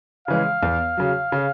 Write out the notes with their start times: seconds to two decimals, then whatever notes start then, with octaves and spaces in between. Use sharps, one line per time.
0.28 C#3 E3 G#3 F5
0.63 E2
0.97 C#3 F#3
1.32 C#3